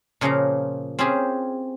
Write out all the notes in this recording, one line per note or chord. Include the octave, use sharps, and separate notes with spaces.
A#2 C#3 F3 A#3 F5 A#5
C4 C#4 F4 G4 G#4